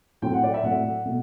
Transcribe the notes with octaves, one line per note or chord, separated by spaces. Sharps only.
A2 F#3 A3 C4 G5
F#5
D5
E5
A2 F#3 A3 C4 F#5
B2 A3